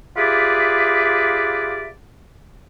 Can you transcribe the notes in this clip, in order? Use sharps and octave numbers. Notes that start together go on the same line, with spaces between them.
F4 G4 G#4 B4 D5 E5